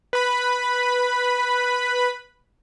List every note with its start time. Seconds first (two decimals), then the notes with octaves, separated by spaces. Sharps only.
0.13 B4 B5